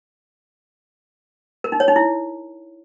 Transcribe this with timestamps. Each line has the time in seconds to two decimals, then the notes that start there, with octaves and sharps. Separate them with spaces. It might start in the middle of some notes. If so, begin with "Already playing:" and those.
1.64 A#4
1.72 D#4
1.80 C#5
1.88 D#4
1.96 E4